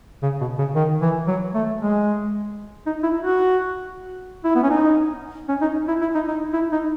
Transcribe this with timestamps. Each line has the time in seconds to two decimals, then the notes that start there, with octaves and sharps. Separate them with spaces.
0.23 C#3
0.41 B2
0.58 C#3
0.75 D#3
1.02 E3
1.27 F#3
1.55 A3
1.81 G#3
2.86 D#4
3.03 E4
3.20 F#4
4.44 E4
4.55 B3
4.63 C#4
4.71 D#4
5.49 C#4
5.62 D#4
5.88 E4
6.01 E4
6.15 D#4
6.28 D#4
6.53 E4
6.72 D#4